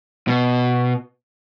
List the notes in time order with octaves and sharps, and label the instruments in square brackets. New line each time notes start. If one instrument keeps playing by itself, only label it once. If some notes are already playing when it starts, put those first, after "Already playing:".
[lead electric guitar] B2